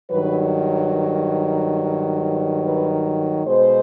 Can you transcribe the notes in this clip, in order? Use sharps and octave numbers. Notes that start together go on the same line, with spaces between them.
G2 D#3 F#3 B4
B4
B2 G#3 C5